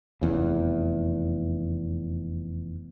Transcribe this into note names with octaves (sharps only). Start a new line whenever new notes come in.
F1 E2 C#3